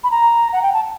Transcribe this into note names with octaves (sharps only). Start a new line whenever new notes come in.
B5
A#5
F#5
G5
A5